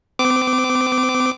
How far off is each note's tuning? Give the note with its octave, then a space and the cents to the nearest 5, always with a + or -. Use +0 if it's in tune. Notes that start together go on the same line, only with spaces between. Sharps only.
C4 -40 D6 +0